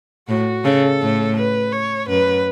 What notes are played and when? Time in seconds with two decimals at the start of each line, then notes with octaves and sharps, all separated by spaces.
0.28 A2 F#4
0.64 C#3 A4
1.01 A2
1.36 B4
1.72 C#5
2.08 F#2 B4